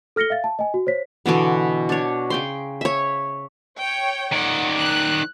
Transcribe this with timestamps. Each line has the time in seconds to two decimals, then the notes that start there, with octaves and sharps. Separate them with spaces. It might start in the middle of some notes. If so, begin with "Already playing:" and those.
0.16 A4 F6 A#6 C#7 G7
0.30 E5 F5 A6
0.44 A5
0.59 D#5 G#5
0.74 F#4
0.87 C5 C#5 B6
1.26 B2 D3 E3 B3
1.89 D4 C#5
2.30 C#3 G5 C6
2.81 C#5 E5
3.77 C#5 G5
4.33 D#3 D5 F#5
4.76 F#6